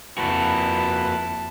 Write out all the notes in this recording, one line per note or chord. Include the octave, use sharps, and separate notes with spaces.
F2 A#3 E4 F#4 B4 A5